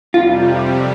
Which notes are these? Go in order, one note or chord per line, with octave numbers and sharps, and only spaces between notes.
F2 C3 G3 F4